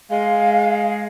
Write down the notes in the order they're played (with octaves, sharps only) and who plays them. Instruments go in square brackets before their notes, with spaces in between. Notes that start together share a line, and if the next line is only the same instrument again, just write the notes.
[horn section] G#3 [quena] F5